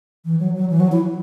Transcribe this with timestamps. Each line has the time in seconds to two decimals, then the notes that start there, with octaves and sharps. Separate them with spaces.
0.25 E3
0.40 F#3
0.55 F#3
0.70 E3
0.80 F#3
0.92 E4